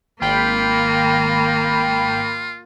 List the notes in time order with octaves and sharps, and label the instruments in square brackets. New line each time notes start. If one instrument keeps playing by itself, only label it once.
[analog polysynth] G#1 G5 B5 [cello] A#3 [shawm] F4